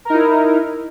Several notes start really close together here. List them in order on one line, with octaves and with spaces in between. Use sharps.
A#4 D#4 E4